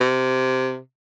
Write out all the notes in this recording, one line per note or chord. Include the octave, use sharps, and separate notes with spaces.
C3